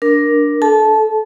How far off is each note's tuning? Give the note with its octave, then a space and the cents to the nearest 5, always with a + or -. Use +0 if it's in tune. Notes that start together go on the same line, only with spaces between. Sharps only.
D4 +0 A#4 +10
A4 -25 A5 -20